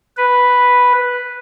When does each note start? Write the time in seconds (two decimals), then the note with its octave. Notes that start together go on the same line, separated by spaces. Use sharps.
0.17 B4